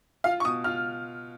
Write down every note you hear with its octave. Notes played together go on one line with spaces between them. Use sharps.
F4 F5
C#6
B2 D#6
F4 F6